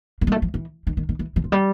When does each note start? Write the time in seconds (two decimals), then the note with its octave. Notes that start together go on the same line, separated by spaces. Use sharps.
0.21 A#3
0.27 G#3
0.32 A3
0.42 F3
0.54 E3
0.87 D#3
0.97 D#3
1.09 D#3
1.19 E3
1.36 E3
1.44 F3
1.52 G3